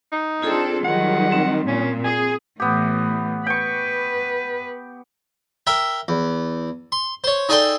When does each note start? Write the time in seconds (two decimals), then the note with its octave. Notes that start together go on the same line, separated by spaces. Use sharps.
0.12 D#4
0.42 C4 D4 F4 G#4 A4 C6
0.85 D#3 F#3 G3 F#5
1.32 C4
1.68 A#2 C#4
2.04 G#4 G#5
2.60 A2 E3 B3 G4
3.47 B4 G5 C#6
5.67 A#4 E5 G5
6.08 E2
6.92 C6
7.24 C5 C#5
7.49 D#4 G#4 A4 D5 G5 C6